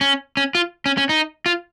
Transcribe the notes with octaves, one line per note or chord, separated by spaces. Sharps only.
C#4
C#4
F4
C#4
C#4
D#4
F4